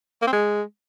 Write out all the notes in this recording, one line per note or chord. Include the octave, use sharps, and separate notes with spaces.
A#3
C4
G#3